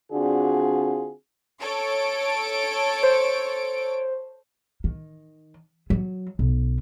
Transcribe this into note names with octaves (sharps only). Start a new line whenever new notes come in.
D3 C4 D4 F4 F#4 G#4
A4 C#5 D7
C5
D#3
F#3
B1